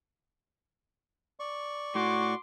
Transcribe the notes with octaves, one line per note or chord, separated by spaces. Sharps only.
D5 C#6
A2 F#4 C6 D6